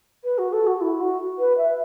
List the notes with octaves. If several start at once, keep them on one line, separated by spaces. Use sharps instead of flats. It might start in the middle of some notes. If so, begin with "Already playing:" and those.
B4
F#4
A4
F#4
E4
F#4
B4
E5